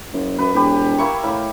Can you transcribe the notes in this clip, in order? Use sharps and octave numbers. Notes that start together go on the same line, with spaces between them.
F#1
F#2 B4
E1 G4 B4
A#3 E4 C#6
A2 E5 F5 B5